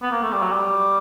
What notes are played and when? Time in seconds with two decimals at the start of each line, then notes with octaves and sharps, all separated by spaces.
0.02 B3
0.12 A#3
0.23 A3
0.33 G3
0.42 F#3
0.52 G3